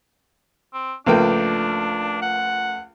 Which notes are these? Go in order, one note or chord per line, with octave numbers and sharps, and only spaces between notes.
C4
C#2 F3 A3 A#3 D4 B4 G5
F#5